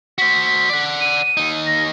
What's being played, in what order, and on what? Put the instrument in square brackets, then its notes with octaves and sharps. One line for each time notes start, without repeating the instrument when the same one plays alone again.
[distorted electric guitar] F#4 C5 [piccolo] B6
[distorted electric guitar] D5 F#5
[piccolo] D#7
[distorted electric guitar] D#2 D#4
[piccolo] A#6